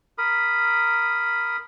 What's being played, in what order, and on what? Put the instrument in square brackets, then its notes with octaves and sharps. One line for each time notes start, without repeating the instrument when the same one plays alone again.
[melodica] A#4 B5 D#6